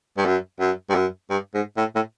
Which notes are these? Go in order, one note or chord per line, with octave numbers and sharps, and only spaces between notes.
G2
F#2
F#2
G2
F#2
G2
G#2
A2
A2